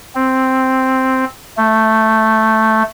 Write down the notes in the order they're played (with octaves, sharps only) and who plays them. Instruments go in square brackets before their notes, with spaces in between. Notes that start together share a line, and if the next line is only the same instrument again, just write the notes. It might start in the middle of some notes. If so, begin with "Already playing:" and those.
[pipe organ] C4
A3